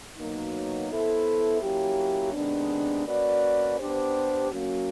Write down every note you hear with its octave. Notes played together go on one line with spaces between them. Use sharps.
B2 F#3 A#3 D#4
B3 E4 A4 C5
F#3 A#3 C#4 E4 G4
C3 D#3 G#3 B3 D4
A#3 C#4 F#4 B4 D5
B3 D4 G4 C5
F#3 A#3 C#4 F#4